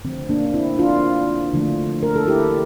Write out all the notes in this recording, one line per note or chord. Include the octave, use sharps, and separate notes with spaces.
D3 F3 A3 C4
A#3 D4
D4
C4 E4
D4 F4
D3 F3 A3
A#4
A4
E4 G4